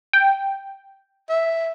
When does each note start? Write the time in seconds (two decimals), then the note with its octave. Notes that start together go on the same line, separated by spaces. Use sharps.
0.13 G5
1.29 E5